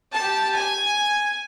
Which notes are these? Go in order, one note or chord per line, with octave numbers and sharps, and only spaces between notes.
G4 A5
G#5